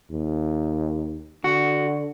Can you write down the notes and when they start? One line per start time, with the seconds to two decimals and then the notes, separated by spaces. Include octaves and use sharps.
0.10 D#2
1.44 D3 F#4